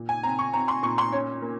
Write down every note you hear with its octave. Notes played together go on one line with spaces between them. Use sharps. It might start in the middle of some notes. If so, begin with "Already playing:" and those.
Already playing: A#2
G#5
C4 A#5
C#6
C4 A#5
C6
A#2 C#6
C6
C#4 C#5
A#3